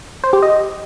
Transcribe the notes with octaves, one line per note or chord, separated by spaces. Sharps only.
C5
G4
D#5